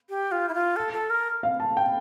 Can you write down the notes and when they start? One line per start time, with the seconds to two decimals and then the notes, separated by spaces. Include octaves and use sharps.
0.09 G4
0.32 F4
0.49 E4
0.54 F4
0.76 A4
0.93 A4
1.10 A#4
1.43 F5
1.60 A5
1.77 G5